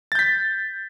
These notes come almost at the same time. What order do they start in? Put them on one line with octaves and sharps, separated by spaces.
A6 G6 B6